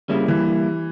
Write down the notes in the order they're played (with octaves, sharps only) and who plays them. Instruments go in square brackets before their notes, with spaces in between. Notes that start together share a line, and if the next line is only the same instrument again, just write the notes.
[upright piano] C#3 [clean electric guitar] G3 A#3 E4
[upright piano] E3